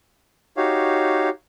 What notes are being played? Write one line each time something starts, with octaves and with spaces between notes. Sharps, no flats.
D#4 F#4 G4 C#5 F5